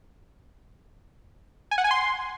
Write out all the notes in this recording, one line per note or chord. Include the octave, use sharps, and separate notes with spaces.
G#5
F#5
G#5
C6